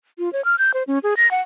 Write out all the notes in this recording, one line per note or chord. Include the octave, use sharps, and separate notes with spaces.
F4
C#5
F6
G6
C5
C#4
G#4
A#6
F#5